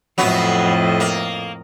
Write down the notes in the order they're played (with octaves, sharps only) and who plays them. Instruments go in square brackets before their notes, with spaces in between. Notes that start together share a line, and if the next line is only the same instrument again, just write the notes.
[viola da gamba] F2 A2 D#5 [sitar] F#3 B3 F#4
[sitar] A#3